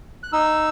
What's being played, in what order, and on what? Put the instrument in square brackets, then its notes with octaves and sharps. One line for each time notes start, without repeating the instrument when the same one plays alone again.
[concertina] F#6
D#4 E6